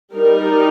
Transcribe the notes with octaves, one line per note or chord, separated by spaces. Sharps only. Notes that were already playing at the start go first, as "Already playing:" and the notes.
G3 D#4 A#4